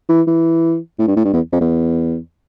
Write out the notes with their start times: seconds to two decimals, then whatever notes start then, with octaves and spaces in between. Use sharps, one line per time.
0.09 E3
0.27 E3
0.99 A2
1.07 G2
1.16 A2
1.25 G2
1.34 E2
1.52 F2
1.60 E2